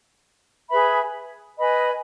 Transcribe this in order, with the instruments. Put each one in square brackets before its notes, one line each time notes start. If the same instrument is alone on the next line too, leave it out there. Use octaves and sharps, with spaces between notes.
[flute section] G#4 B4 E5 B5
B4 D#5 G#5 B5